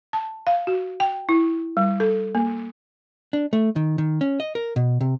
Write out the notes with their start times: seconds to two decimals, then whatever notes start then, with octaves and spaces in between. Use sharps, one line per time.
0.13 A5
0.47 F5
0.67 F#4
1.00 G5
1.29 E4
1.77 G3
2.00 A4
2.35 A#3
3.33 D4
3.53 A3
3.76 D#3
3.98 D#3
4.21 C#4
4.40 D#5
4.55 A#4
4.76 B2
5.01 C3